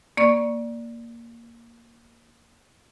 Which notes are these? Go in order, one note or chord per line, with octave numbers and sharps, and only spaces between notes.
A#3 D5 C#6